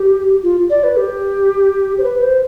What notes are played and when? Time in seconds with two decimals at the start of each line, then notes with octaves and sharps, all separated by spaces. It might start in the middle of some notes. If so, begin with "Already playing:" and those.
Already playing: G4
0.43 F4
0.70 D5
0.84 B4
0.97 G4
1.98 C5
2.04 B4
2.22 C5